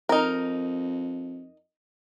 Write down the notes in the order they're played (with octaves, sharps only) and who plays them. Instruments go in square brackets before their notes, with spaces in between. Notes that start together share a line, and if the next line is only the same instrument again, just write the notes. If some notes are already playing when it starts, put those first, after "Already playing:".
[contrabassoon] F2 [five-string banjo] D#4 A#4